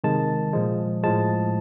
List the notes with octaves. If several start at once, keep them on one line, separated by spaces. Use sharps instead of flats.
C3 D#3 G#3 A5
A#2 F3 G#3
A2 F3 G#3 A5